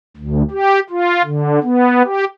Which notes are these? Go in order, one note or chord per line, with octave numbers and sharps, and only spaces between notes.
D2
G4
F4
D3
B3
G4